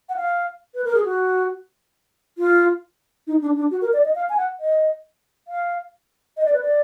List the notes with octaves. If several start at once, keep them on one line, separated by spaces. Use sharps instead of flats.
F#5
F5
B4
A#4
G#4
F#4
F4
D#4
D4
D4
F#4
A#4
D5
D#5
F5
G#5
F#5
D#5
F5
D#5
D5
B4
D5